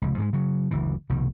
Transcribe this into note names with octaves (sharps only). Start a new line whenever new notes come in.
F1 C#2
G#2 G3 G#3
C#3 F#3
F#1 D2 E3
F1 C2 B2 D#3